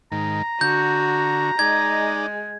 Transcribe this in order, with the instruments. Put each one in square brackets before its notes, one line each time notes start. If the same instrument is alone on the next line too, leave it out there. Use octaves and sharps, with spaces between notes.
[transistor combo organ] G#2 D#3 [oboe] A#5
[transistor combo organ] D3 [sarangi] F#4 [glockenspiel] G6
[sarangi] G#3 [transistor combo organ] D#4 D5 [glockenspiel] G#6